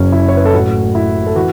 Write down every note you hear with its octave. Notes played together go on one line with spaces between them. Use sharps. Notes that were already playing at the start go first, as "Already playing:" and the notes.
Already playing: F#1 F#2 C#3 F#3 C#4
E4
C#5
B4
A4
A1 A2 F#3 F#4
E4
A4
E3 F#4